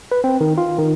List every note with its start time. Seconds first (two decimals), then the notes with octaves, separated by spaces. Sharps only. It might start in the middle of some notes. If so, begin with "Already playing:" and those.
0.12 B4
0.24 C4
0.41 D#3
0.58 F4
0.79 D#3